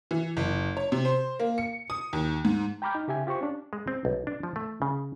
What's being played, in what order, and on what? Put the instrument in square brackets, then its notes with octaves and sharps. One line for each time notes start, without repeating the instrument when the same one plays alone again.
[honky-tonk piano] E3
F#1
C#5
C3
C5
A#3
C#7
D#6
D#2
G#2
[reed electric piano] G5 A#5 B5 D6 F6 G6
D#4
C#3 G4 E5 G#5
F4 G4 C5 C#6
C#4 D4
[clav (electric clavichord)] G#3
C4
B1
D4
F3
A3
C#3